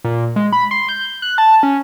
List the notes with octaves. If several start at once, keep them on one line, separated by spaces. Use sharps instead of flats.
A#2
G#3
B5
C6
G6
F#6
A5
C#4